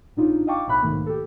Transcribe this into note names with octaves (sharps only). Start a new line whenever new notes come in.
G#1 A2 D4 D#4 F4
D#5 F5 G5 A5 C#6 D6
B1 A2 E5 B5 F#6
B1 G#2 D#3 A3 A#3
G4 A4